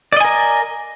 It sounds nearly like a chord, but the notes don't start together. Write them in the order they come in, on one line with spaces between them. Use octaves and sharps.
D5 D#5 G#5 A#4